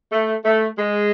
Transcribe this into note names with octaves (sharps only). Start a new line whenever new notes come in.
A3
A3
G#3